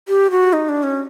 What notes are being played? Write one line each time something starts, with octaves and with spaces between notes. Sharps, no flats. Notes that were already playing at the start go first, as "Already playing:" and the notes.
G4
F#4
D#4
D4
C#4